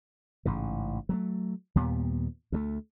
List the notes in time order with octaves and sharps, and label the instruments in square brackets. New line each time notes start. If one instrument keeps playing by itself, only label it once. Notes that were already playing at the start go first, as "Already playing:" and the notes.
[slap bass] A1 G#2 C#3
F#3 G#3 A3
D#2 A#2 G3 B3
D2 G3 A3